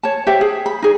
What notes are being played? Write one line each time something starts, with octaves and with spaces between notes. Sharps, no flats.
C#5 A5
G4 C5 E5 F#5
G#4
B5
D#4 G#4 D5